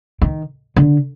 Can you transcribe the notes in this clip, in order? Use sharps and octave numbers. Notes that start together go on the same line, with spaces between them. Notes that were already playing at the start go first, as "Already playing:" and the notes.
D#3
D3